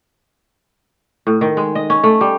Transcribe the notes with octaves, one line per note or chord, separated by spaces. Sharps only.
A2
D#3
G#3
D#5
C#4
A3
G3